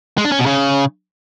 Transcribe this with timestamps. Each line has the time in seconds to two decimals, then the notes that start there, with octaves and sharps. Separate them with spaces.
0.18 G#3
0.25 D4
0.32 C#4
0.39 B2
0.46 C#3